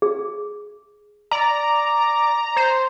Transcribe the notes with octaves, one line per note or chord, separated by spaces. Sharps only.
G#4
D5 A#5
C5